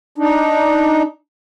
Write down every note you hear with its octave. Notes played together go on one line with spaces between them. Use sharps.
D4 D#4